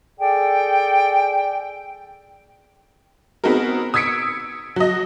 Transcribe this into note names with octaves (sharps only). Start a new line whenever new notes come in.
G#4 A4 D5 G5
B3 C4 D#4 F#4 G#4 A#4
D#6 E6 G#6 B6 C#7 D7
F#3 D#5